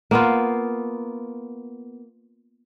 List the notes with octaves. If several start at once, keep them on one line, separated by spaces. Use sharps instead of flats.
A#3 B3 F4